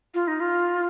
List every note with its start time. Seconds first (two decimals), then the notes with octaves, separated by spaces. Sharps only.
0.14 F4
0.27 D#4
0.40 F4